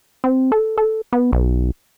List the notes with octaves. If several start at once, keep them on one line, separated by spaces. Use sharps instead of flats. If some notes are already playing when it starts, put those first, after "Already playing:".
C4
A4
A4
B3
B1